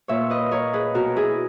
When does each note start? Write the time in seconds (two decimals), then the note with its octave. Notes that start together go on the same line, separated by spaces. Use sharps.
0.08 A#2 C#5 E5
0.30 B4 D#5
0.51 A#4 C#5
0.73 G#4 B4
0.94 B2 F#4 A#4
1.16 E4 G#4